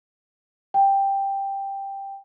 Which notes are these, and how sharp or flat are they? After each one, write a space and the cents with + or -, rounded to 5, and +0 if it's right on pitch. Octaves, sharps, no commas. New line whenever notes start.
G5 +5